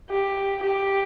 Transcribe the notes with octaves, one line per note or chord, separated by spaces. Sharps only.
G4
G4